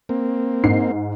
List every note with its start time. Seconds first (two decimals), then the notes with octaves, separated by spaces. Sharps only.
0.09 A#3 C4
0.63 G#2 C7